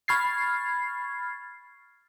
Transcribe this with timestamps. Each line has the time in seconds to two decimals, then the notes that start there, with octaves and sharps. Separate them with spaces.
0.08 B5 C#6 F6 G#6 A6 C7